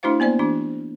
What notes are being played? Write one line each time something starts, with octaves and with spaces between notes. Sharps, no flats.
A3 D4 E4 F#4 C5 F5
A#3 B3 C5 D5
E3 D4 F#4